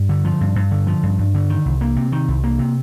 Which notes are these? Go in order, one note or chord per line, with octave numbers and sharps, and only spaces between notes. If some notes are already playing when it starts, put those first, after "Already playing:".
Already playing: G2
D3
F3
G2
G2
D3
F3
G2
G2
D3
D#3
C2
A#3
C3
D#3
C2
A#3
C3